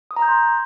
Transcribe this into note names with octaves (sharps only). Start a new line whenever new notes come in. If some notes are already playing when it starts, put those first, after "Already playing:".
D#6
A#5
G6
C6